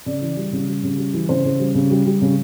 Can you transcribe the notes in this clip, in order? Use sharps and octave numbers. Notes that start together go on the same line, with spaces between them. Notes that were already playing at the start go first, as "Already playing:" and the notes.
C#3 D5
E3
G3
C#3
G3
C#3
G3
E3
C#3 C5
C#3
G3
C#3
G3
G3
C#3